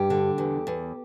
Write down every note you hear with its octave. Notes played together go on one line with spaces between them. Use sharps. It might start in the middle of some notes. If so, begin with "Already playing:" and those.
Already playing: G2 G4
D3
E2
E2